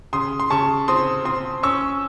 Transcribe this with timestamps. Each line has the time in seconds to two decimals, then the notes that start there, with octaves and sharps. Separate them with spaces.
0.13 C#3 C6 D#6
0.40 C6
0.50 C#3 A5 C#6
0.88 C4 C6 D#6
1.25 C4 C6 D#6
1.63 C#4 C#6 E6